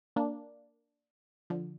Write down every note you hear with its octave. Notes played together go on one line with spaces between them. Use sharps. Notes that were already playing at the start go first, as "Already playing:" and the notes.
A#3 D4
D3 F3